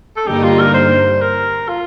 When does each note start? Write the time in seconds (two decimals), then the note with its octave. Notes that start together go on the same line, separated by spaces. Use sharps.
0.17 A4
0.27 G2 D3 G3 A#3 D#4 G4
0.44 F4
0.60 A#4
0.74 C5
1.22 A#4
1.68 F4